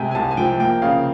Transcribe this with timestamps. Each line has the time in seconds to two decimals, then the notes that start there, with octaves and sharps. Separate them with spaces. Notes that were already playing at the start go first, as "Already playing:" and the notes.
Already playing: C3 G#3 G5 G#5
0.11 G#5
0.15 C2 A5
0.31 G#5
0.37 F3 G5
0.60 A#3 G5
0.82 C#3 F5